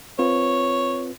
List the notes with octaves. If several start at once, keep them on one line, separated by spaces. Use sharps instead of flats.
C4 F4 B4 C#5